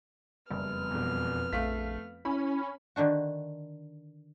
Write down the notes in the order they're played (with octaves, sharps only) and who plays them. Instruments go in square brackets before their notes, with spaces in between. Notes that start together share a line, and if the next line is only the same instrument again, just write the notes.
[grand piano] F#1 [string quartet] F2 B3 F6 [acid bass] G3
[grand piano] E1 E2
[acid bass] A#1 [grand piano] A3 F5 B6
[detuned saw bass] C#4 [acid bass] E4 [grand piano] B5
[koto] D3 D#3 D4 F#4